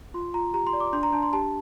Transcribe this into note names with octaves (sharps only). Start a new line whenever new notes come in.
F4 C6
F4 A#5
G4 A#5
C6
D5
D6
D4 C6
A#5
D4 A5
C6
G4 A5